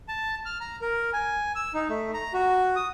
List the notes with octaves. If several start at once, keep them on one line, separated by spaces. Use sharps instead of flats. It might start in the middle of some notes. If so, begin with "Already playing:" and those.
A5
F6
A#5
A#4
G#5
E6
D#4
A3
A#5
F#4
D#6